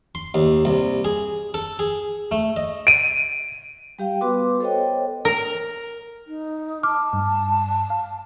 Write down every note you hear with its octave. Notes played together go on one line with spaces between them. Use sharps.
C6
D#2
C2
G#4
A4
G#4
A3
D#5
D7 D#7
G3 G4 F5 G5
B3 F#4 B4 C6 D6
A4 C5 C#5 D#5 G5
A#4
D#4
A5 D6 F6
G2
F5